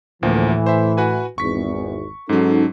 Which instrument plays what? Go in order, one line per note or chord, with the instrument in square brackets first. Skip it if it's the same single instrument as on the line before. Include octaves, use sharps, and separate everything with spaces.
[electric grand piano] D2 F3 A#3 [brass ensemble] A2 E3
[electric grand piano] C5 E5
F#4 B4 G#5
[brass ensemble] G#1 E2 [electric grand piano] C#6 B6
[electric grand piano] G#2 F#3 [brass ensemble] C#4 D#4 A4